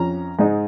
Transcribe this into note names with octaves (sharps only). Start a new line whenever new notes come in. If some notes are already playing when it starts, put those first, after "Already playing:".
Already playing: F2 F3 C#4 A#5
G#2 G#3 D#4